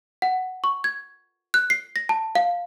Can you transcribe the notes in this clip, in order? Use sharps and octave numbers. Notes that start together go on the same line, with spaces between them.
F#5
C#6
G#6
F#6
C7
A#6
A5
F5